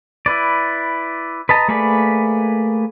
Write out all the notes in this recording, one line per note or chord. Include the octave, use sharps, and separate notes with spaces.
E4 B4 D5
B4 D#5 A5 A#5
A3 A#3 G#4 B4 D5